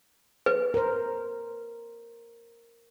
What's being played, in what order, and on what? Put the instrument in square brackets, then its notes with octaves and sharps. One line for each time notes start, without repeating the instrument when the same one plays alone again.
[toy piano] B4
[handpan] A#4 C5